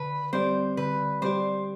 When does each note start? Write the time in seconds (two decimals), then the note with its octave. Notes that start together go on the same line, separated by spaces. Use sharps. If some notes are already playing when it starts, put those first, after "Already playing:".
Already playing: D3 B4
0.33 G3 C4 G4 C5 D5
0.77 D3 B4
1.22 G3 C4 G4 C5 D5